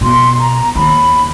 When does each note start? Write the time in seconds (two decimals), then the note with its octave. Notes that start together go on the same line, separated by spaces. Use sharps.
0.01 B2 C6
0.39 A#5
0.75 D#2 B5